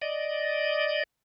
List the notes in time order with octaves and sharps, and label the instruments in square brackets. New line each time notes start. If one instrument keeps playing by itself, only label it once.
[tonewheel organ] D5 D#5